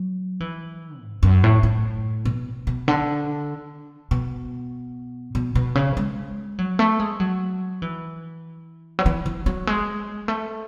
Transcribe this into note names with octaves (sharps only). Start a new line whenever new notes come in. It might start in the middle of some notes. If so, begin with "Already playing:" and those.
Already playing: F#3
E3
G#2
F#2
A2
A2
B2
B2
D3
B2
B2
B2
C#3
G#3
F#3
A3
G#3
F#3
E3
F#3
E3
E3
F#3
G#3
A3